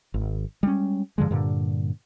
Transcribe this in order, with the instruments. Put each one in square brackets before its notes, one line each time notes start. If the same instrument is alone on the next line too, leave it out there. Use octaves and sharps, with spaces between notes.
[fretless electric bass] G#1
G3 G#3 C4 C#4
G2 D3 F3 G#3
G2 A#2 D3